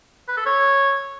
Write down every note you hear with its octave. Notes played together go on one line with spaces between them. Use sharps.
B4
A4
C#5